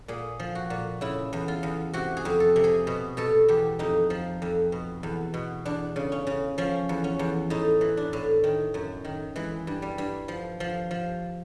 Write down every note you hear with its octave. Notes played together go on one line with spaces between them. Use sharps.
A#2 G#4
F3
F#4
A#2
C#3 E4
E2
F4
E2
C3 F#4
G#4
F2
A4
C3
G#4
B2
B2 A4
E2 G4
F2 D#4
F3
F2
B2
E2
B2
E2 D4
C#3
C#4
C#3
F3 C#4
E2
C#4
E2
A2 D#4
E3
D4
A2
D#3
F#2
D#3
E3 G#3
G2
G3
G2
F3
F3
F3